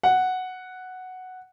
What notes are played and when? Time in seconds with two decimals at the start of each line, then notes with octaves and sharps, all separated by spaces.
0.03 F#5